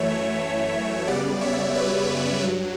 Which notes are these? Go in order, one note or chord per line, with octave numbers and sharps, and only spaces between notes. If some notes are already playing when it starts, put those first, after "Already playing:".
Already playing: F#2 E3 A3 C#5 E5
F#2 C#3 G3 B3 D5 F#5
C#5 E5
B4 D5
G2 F#3